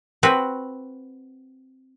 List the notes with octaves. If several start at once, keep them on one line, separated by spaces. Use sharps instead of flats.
C4 F#4 B4